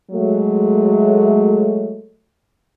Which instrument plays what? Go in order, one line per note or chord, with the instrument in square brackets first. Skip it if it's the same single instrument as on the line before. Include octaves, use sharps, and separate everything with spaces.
[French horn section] F#3 G#3 A3